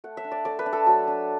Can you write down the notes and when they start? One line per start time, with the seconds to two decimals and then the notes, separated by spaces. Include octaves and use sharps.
0.04 A3 F#5
0.17 E5
0.24 D4
0.32 D5
0.45 A3 D5
0.59 B4
0.66 D4
0.73 A4
0.87 F#3 A4
1.07 D4